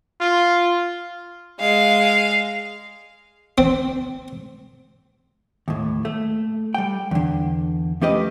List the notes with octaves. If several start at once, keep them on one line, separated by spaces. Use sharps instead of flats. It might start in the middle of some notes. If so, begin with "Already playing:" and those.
F4
G#3 F5
C4
D#2 A2
A3
G3 G5
E2 D3
F3 A3 C#4 G4 B4 D#5